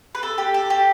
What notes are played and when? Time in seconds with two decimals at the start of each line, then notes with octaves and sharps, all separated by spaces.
0.15 B4
0.23 A4
0.38 G4
0.54 A4
0.70 G4